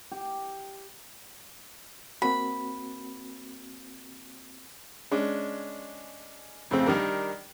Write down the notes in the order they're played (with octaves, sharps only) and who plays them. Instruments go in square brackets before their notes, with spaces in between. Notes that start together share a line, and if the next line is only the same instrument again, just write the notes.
[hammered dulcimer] G4
[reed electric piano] A#3 C4 F#4 [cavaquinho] B5
[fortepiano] G#3 C#4 D4
F2 C#3 A3 C4
D#3 G3 D4 A#4